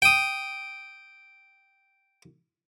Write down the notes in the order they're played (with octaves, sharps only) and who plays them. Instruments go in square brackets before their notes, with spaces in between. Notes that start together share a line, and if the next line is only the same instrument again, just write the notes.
[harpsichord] G5 D#6